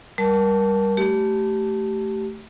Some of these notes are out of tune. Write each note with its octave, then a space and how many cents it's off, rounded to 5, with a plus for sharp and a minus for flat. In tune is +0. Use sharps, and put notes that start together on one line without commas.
G3 +0 A#4 +20 A5 -5
A3 +0 G4 -20